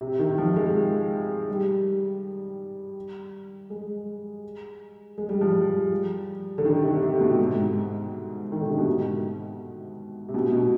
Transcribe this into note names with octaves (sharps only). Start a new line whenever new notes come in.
C3
D#3
F3
G#3
G3
G#3
G#3
G3
F3
G3
D3
D#3
C3
C3
B2
G#2
D#3
D3
C3
B2
G#2
C3
B2
B2